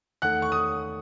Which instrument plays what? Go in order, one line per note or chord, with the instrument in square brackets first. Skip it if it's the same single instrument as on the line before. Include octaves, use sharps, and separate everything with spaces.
[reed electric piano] E2 D#3 A3 D#4 A4 [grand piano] F#5 F#6
[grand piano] C#6
D#6